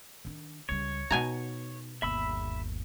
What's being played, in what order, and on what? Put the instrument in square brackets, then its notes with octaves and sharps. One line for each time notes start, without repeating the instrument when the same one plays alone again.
[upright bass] D#3 D4
[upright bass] C#2 G3 [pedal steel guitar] C#5
[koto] B2 G#5 A#5 [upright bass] D#4
[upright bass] G1 D#2 [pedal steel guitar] E5 B5 E6